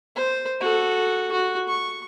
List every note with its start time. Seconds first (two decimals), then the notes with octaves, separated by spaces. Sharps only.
0.16 C5
0.61 F#4 A4
1.32 F#4
1.68 C#6